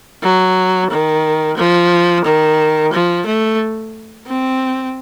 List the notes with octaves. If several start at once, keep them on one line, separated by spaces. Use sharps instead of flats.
F#3
D#3
F3
D#3
F3
A3
C4